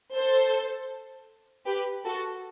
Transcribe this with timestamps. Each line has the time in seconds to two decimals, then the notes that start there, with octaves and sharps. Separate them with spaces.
0.14 A4 C5
1.66 G4 B4
2.05 F#4 A4